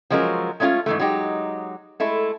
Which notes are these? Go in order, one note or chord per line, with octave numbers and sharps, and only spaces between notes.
F3 F#3 G#3 C#4 A#4
G#3 A3 C#4 D#4 F4
G#2 E3 A3
F#3 G#3 D#4 G4
G#3 A3 E4